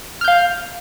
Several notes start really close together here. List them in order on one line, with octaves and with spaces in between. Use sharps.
F6 G6 F5